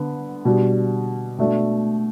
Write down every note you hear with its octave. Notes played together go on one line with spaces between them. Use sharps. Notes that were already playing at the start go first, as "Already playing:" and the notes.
Already playing: D3 B3
B2 G3 D4
B2 A3 D4